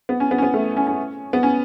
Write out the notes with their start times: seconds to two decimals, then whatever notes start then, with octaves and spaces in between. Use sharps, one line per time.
0.09 B3
0.20 C#4
0.31 B3
0.38 C#4
0.43 B3
0.54 A3
0.77 C#4
0.87 C#4
1.33 B3
1.43 C#4